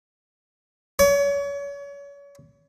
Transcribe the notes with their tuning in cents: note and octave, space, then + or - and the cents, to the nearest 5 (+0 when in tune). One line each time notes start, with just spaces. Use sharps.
C#5 +35